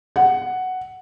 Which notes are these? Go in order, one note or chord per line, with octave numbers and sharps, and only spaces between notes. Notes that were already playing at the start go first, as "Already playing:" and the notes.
F#5